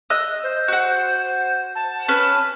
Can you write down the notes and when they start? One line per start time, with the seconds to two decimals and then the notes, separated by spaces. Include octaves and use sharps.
0.10 D#5 E6 F#6
0.43 C5
0.68 F#4 F#5
1.75 A5
2.08 C#4 B4 F#6